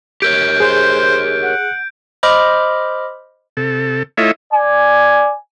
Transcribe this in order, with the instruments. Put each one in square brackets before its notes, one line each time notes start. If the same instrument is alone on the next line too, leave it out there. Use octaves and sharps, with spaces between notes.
[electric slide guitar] G4 A#4 C#5 [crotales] G6 D7
[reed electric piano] G#4 [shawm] C5
[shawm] F#5
[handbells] C5 D#5 B5 D6 F6 G6
[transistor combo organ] C3 A4
A3 E4 F4 C#5 D#5 E5
[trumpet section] D5 G#5